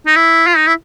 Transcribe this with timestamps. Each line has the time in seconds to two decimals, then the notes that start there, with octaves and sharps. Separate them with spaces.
0.07 D#4
0.16 E4
0.47 F4
0.57 D#4
0.67 E4